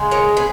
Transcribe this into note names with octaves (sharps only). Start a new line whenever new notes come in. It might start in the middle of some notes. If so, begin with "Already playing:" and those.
Already playing: C#3 G#3
A#4 C#5
G#4 B4